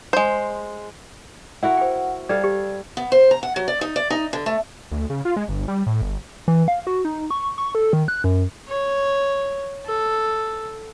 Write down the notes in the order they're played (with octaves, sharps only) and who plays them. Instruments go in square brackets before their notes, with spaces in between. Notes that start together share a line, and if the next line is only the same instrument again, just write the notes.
[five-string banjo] G#3 C5
[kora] E4 F#4 A#4 [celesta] F#5
[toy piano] C5 G5
[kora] G3 A4 F5 [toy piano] D5 [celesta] G#6
[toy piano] G4
[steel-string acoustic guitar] B3
C5
A#5
F#5
F#3
D5
D#4
D5
D#4
D3
A3
[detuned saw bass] D2
C#3
F4
G#3
G1
G3
A2
G1
[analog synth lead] E3
F5
F#4
D#4
C#6
C#6
A4
D#3
F#6
F#2
[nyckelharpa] C#5
A4